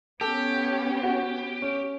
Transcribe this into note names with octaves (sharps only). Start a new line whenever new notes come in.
B3 C#4 G4 A4
F#4
C#4